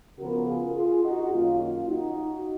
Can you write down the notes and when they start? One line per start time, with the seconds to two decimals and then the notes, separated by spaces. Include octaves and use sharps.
0.18 C#3 F3 B3 F#4 A#4
0.47 F4 G#4
0.75 F4 G#4
1.03 D#4 F#4
1.32 F#2 D#3 A#3 C#4 F4
1.60 F4
1.89 D#4 F#4